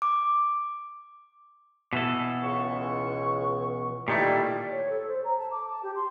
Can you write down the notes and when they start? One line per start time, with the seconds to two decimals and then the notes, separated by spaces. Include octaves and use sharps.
0.02 D6
1.93 B2 E3 A4
2.42 C#2 C#6
4.08 A#2 D#3 G3 A3 E4
4.71 C#5
4.89 A4
5.08 C5
5.24 A#5
5.38 A5
5.51 D6
5.70 A5
5.83 G4
5.95 C6